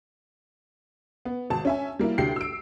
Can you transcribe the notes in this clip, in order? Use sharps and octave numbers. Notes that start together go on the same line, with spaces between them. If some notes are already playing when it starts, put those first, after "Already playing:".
B3
G#1 A5
C#4 E5 G#5
G3 A#3 E4
D2 D4 G4 G5 C7
E6 D7